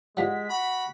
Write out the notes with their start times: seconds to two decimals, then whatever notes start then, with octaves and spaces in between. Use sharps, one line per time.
0.17 F3 G3 G#3 F#5 B6
0.50 F#4 B5